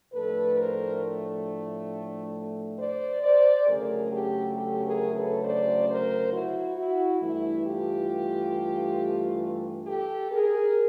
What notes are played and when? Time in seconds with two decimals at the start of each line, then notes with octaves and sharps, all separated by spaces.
0.13 A2 F3 A3 D4 A4 B4
0.57 A#4 C5
2.78 C5 D5
3.24 C5 D5
3.67 D2 C#3 F#3 A3 C#4 G#4 A#4
4.11 G4 A4
4.56 G4 A4
4.85 G#4 A#4
5.14 A4 B4
5.44 C5 D5
5.88 A#4 C5
6.32 E4 F#4
6.77 E4 F#4
7.21 G2 E3 A3 E4
7.66 F4 G4
9.87 G4 A4
10.31 G#4 A#4